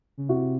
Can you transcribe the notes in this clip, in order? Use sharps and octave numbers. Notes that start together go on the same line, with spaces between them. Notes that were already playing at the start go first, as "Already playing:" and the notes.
C#3
C3 E4 F#4